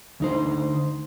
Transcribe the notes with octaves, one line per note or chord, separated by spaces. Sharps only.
D2 D#4 C5